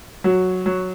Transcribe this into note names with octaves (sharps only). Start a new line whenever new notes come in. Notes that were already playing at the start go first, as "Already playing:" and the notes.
F#3 F#4
F#3